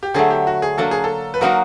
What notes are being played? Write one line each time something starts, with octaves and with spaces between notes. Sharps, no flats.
G4
D3 F#3 A3 G#4
G4
F#4
G#4
F#3 A#3 D4 F#4 A4
G#4
A4
B4
F#3 A#3 D#4 F#4 A#4